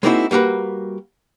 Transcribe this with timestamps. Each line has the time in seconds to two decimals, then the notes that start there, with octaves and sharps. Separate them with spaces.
0.03 G#3 A#3 C4 D#4 E4 F#4
0.31 G3 A#3 F#4 A#4 B4